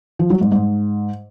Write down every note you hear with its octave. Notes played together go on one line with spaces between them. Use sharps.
F3
F#3
G#2
G#2